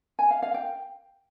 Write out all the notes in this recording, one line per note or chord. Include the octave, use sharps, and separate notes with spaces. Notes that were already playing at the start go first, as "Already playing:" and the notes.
G#5
F5
F5
G5